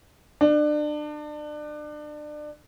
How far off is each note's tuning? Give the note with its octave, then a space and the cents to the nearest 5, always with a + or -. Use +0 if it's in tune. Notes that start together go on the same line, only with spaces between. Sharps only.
D4 +30